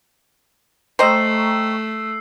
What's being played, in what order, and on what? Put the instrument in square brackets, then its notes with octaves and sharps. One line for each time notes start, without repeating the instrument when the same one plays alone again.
[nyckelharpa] A3 [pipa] C5 D#5 [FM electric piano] G5 A#5 C#6 [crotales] E6 C7